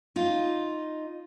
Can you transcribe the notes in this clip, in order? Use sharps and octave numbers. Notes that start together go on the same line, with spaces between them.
D#4 F4